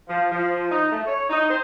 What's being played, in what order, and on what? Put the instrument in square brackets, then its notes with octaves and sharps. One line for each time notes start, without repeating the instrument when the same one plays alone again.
[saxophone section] F3
F3
D#4
A3
C#5
D#4
C5